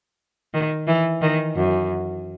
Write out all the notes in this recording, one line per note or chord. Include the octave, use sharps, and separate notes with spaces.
D#3
E3
D#3
F#2